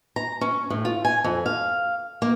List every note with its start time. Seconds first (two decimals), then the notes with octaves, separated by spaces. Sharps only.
0.16 A#5
0.41 C#4
0.70 A2
0.85 F4
1.05 G#5
1.24 F2
1.46 F5
2.22 A#3